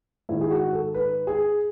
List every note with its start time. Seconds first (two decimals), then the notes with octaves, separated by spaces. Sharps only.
0.29 G#2 D#3 E4
0.41 G#4
0.51 F#4
0.73 A4
0.94 B4
1.27 G#4